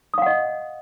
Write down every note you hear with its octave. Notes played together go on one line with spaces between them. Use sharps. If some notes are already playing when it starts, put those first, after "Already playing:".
D#5 F5 F#5 D#6